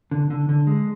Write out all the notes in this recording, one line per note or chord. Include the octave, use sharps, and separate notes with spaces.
D3
D3
D3
G#3